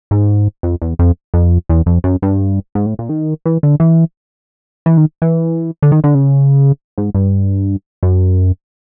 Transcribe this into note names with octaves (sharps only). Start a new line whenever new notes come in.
G#2
F2
E2
F2
F2
E2
F2
F#2
G2
G#2
A2
A#2
D#3
E3
D3
E3
E3
D#3
E3
D3
D#3
D3
C#3
G#2
G2
F#2